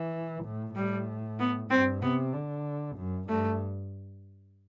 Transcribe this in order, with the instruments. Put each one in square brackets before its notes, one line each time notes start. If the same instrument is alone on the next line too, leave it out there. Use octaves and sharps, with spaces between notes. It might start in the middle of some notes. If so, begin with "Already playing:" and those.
Already playing: [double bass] E3
A2
[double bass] A2 [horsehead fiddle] G3
[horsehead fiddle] B3
[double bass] G2 [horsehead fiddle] C4
[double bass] C3 [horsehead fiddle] B3
[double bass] D3
F#2
[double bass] G2 [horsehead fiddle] A3